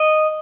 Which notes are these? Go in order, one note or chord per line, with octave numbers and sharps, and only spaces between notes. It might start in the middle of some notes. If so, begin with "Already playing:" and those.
Already playing: D#5